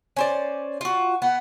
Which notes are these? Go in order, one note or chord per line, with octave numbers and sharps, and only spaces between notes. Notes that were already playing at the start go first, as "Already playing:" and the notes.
C#4 C5 D5
F4 F#4
B3 F#5